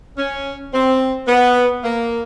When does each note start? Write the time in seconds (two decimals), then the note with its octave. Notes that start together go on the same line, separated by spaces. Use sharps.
0.18 C#4
0.73 C4
1.28 B3
1.84 A#3